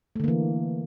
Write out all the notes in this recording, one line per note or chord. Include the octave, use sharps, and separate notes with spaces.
D3 E3 A3 A#3